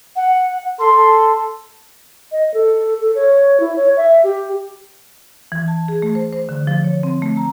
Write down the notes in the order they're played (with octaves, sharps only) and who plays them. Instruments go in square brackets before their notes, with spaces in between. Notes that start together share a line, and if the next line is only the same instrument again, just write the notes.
[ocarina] F#5
[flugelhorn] A4 [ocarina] C6
[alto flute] D#5
A4
A4
C#5
E4
C#5
E5
G4
[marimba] E3
A5
G#4
A3
C5
C5
D3
F3
C#5
C4
A3
A#5